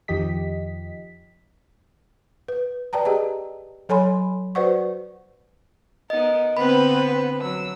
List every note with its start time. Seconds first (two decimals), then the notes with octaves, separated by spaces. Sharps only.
0.08 F2 D#3 F3 G4 D#5 B6
2.48 B4
2.93 B4 D5 G5 A5 A#5
3.05 G4 G#4 D#5 G5 A#5
3.89 F#3 A4 C#5 G#5 B5 C6
4.55 F#4 B4 C5 D5 F#5 C#6
6.10 B3 D#4 A#4 D#5
6.57 D3 B3 C4 B4 B5
7.41 F#3 E6